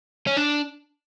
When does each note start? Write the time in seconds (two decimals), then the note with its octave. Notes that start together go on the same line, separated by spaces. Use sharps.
0.27 C#4
0.37 D4